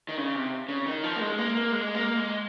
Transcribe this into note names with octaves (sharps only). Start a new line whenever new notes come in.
D#3
C#3
C3
C#3
D#3
F3
A#3
G#3
A#3
A#3
G#3
A#3
G#3